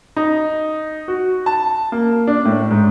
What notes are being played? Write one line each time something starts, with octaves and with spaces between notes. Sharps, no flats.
D#4
F#4
A5
A#3
D4
A2
G#2